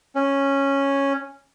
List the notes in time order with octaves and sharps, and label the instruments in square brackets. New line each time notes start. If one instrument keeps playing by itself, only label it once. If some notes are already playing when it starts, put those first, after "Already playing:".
[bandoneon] C#4